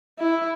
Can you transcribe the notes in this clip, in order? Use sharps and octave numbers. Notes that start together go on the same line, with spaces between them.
E4